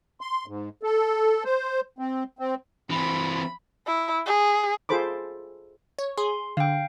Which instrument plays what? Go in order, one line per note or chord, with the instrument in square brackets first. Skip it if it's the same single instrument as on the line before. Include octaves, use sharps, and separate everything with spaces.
[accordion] C6
G#2
A4
C5
C4
C4
[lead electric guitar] E3 C4 [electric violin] B5
[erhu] E4
G#4
[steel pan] F4 G#4 A4 C5 B5 D6
[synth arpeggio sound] C#5
[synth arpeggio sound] G#4 [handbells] C6
[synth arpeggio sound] D3 [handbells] F5 G5